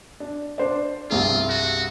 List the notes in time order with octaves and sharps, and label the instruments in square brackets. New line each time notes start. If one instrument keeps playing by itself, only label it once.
[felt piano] D4
D4 C5 D5
[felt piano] C2 G2 G#4 [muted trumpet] F4
[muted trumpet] F#4